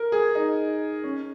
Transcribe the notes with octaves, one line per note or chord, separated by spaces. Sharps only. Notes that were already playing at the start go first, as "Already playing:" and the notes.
Already playing: A#4
G#4
D#4
C#4